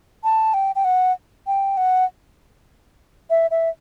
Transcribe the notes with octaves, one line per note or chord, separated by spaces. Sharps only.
A5
G5
G5
F#5
G5
F#5
E5
E5